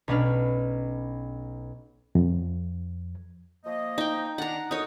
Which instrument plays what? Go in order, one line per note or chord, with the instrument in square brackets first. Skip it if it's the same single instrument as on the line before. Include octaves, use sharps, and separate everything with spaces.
[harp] B1 C#4 D4 B4 F6
[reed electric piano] F2
[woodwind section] F3 A#3 D#5
[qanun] D#4 G5
[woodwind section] D#3 D4 [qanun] F#5 A#5
[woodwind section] D2 A#4 D#6 [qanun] D#4 C#5